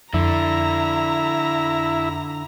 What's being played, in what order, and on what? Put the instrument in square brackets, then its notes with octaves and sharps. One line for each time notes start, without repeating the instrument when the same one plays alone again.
[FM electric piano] F2 [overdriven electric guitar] D3 [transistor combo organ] E4 [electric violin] A#5